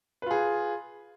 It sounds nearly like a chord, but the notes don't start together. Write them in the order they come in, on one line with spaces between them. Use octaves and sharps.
B4 F4 G#4